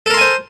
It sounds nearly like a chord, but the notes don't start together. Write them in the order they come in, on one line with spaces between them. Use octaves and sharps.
A4 A#4 C6 G#5 C5